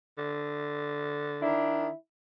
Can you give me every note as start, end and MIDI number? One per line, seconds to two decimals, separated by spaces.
0.18 1.49 50
1.42 1.89 51
1.42 1.89 62
1.42 1.95 64